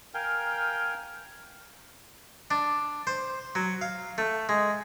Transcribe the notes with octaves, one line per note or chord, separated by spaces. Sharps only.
A#4 F5 G5 G#5
D4
C5
F#3
F5
A3
G#3